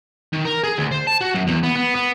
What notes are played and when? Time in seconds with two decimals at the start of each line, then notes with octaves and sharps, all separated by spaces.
0.33 D#3
0.45 A#4
0.63 G#4
0.78 D2
0.91 C5
1.07 A5
1.21 F#4
1.34 F#2
1.47 E2
1.63 B3
1.76 B3
1.95 B3